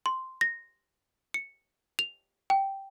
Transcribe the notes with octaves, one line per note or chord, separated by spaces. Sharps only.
C6
A#6
C#7
F7
G5